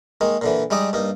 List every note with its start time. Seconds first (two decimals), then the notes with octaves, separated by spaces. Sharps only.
0.21 D#3 G#3 A#3
0.42 A#2 D3 E3
0.70 G3 G#3 D#4 D5 D#5
0.93 G2 A#3 D#4